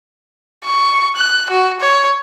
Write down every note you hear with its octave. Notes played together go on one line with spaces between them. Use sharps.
C#6
F#6
F#4
C#5